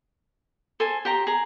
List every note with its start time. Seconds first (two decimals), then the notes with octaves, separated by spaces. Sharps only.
0.80 A4 C5 G#5
1.05 G4 C5 G5 A#5
1.27 G#4 A#5